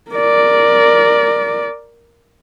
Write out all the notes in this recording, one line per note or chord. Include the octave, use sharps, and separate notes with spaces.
A#4 D5